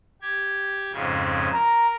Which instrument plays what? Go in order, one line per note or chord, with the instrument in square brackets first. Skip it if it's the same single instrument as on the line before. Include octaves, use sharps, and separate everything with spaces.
[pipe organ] G4 G#6
F2 G#2 C#3
[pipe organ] A#4 [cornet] A#5